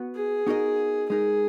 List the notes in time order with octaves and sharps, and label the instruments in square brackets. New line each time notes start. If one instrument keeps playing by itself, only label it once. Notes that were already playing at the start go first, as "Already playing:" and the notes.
Already playing: [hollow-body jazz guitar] B3 F#4 B4
[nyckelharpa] G#4
[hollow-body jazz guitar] B3 D#4 F#4 A#4 D#5
[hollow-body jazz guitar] G#3 D#4 A#4 [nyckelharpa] G#4